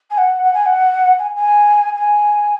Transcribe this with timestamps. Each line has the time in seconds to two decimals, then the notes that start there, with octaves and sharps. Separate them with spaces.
0.10 G#5
0.17 F#5
0.42 F#5
0.53 G#5
0.65 F#5
1.18 G#5
1.35 G#5
1.95 G#5